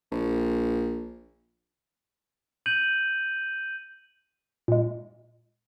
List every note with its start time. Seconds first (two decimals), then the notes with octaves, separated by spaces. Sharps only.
0.12 A#1
2.66 G6 D#7 F#7
4.68 A#2 G#3